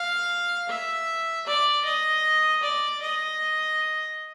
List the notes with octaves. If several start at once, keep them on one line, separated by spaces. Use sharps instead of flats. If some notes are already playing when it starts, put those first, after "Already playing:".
Already playing: F5
E5
D5
D#5
D5
D#5